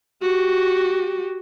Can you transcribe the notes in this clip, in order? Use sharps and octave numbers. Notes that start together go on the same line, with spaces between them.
F#4 G4